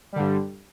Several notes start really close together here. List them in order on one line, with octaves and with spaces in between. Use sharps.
G3 D3 G2